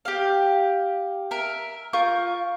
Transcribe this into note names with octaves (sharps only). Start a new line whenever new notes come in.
G4 F5
A#4 E5
F4 A#4 C#6 G6